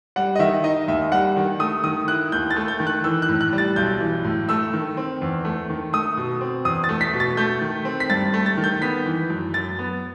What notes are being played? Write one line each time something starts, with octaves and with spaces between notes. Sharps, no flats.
G3 F#5
D#5
D#3 E5
D#4 D#5
D#2 E5
G3 F#5
D#3
A3 D#6
D#3 D#6
E4 F#6
D#2 G6
A6
A3
G6
D#3
F#6
E3 E6
F#6
A2
F#6
G3
A6
B1 G6
E3
A2
A3 E6
D#3
C4
E2
A3
D#3
A3 D#6
B2
C4
E2 D#6
A6
A3
B6
B2
A6
A3 G6
D#3
C4
B6
G2 A6
A3
A6
D#3
G6
B3 B6
E3
F#2
F#2 A6
B3